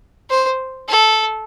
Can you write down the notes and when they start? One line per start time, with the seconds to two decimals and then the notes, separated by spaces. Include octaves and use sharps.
0.30 C5
0.89 A4